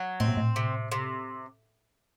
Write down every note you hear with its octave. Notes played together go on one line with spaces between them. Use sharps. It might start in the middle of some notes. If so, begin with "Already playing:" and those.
Already playing: F#3
A2 C4
A#2
A2
C3
C3